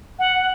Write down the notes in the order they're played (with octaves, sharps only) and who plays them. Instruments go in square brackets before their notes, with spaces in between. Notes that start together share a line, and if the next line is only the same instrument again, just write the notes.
[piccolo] F#5